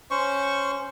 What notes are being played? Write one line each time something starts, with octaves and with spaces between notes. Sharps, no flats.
C#4 C5 C#6